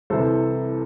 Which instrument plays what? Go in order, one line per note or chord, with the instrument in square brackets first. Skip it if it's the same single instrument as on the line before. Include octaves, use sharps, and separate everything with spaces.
[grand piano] C2 C3 E3 A4 C5